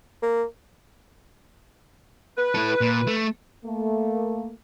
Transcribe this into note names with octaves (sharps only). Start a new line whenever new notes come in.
A#3
B4
E4 A4
A#2
A3
A3 A#3